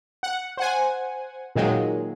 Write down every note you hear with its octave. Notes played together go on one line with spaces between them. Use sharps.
F#5
C5 F#5 G#5
A#2 D#3 F#3 G#3